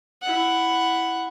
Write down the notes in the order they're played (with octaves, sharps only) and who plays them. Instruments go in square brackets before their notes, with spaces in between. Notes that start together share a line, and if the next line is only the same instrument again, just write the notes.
[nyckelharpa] E4 F#5